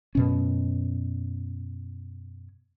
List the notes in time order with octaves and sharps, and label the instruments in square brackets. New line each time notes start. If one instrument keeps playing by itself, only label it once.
[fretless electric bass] F#2 B2 C#4